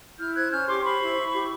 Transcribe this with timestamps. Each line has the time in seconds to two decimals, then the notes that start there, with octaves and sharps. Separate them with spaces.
0.18 E4 F6 G6
0.35 C5 F#6 G#6
0.51 C#4 F6 G6
0.68 G4 C6 D6
0.84 C5 B5 C#6
1.01 E4
1.17 E4
1.34 G4